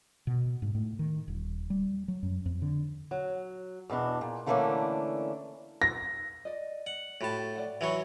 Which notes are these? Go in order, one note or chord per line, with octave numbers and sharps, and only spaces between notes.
B2
G#2
A2
D#3
D#1
G3
F#3
F#2
F2
D3
F#3
E2 B2 E3 D4
A#2
D3 E3 A3 A#3 C#4 D4
A#6
D5 D#5
F#5
A2 F#4 G4 A5 B5
D5 F#5
E3 F#3 E4 B5 C#6